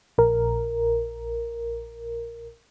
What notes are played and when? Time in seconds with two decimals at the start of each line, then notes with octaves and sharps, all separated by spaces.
0.18 A#1 A#4